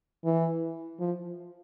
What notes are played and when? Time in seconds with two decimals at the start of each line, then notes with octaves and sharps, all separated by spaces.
0.25 E3
0.99 F3